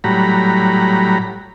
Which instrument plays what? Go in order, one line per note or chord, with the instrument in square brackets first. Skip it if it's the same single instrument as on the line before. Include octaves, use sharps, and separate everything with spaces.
[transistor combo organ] A2 F#3 G3 A#5 B5